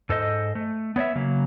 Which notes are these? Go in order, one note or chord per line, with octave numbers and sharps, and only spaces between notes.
G#2 A4 C5 D#5
A3
B3 C#5 D5 E5
C#3 F#3 A#3